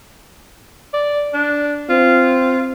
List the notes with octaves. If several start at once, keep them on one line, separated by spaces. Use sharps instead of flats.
D5
D4
C4 F4